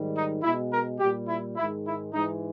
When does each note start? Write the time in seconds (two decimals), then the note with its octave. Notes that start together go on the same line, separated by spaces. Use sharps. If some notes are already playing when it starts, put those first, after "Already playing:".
Already playing: G#2 D#3 G3
0.14 D#4
0.42 B2 G#3 E4
0.71 A#4
0.99 A#2 G3 G4
1.28 E4
1.57 G#2 D#3 G#3 E4
1.86 E4
2.13 G#2 E3 G#3 D#4